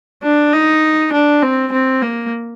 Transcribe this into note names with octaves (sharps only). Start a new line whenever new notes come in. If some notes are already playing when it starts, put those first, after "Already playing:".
D4
D#4
D4
C4
C4
A#3